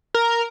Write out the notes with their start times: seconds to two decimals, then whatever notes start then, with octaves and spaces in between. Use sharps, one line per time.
0.14 A#4